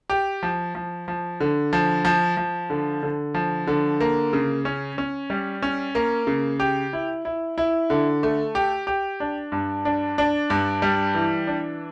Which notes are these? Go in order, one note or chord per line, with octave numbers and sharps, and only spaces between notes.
G4
F3
F3
F3
D3
F3
F3
F3
D3
D3
F3
D3
A#3
C#3
C#4
C#4
G3
C#4
A#3
C#3
G4
E4
E4
E4
D3
A3
G4
G4
D4
G2
D4
D4
G2
G3
E3
D4